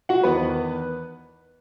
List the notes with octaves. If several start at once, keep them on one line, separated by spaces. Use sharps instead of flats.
F#4 F#5
E2 D#3 B3 B4